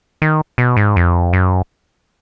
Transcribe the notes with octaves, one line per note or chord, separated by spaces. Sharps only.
D#3
B2
G#2
F2
F#2